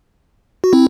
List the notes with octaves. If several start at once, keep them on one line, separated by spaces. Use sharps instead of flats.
F#4
C4 E4